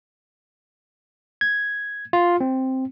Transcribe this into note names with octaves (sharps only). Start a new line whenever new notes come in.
G#6
F4
C4